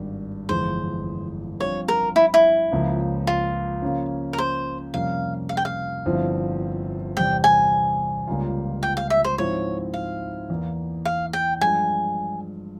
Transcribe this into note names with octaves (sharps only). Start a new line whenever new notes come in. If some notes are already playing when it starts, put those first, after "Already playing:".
Already playing: G#1 G2 G3
G1 F2 E3 G#3 C5
G2 F3 C4 F4 C5 C#5
A#4
E4
E4
C#2 C#3 F3 A#3
F4
C#3 F3 A#3 C#4
A#4
C5
F2 C3 G3 A#3 C#4 F5
F5
G5
F5
G1 G2 F3 C4 E4
E2 C3 G3 C4 G5
G#5
C#2 C#3 G3 A#3 F4
G5
F5
E5
C5
G#2 F3 C4 E4 C#5
F5
E2 E3 A#3
F5
G5
G2 F3 G#3 G#5